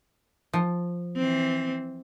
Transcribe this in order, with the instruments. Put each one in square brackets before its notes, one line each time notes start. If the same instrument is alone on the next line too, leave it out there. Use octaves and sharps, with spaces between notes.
[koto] F3
[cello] E3 C4